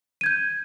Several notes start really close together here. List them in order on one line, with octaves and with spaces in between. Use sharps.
D#7 G#6 G6